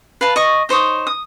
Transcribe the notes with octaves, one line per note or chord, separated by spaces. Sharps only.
B4 F5 A5
D#5 C#6
D#4 C5 C#5 D#6
D#6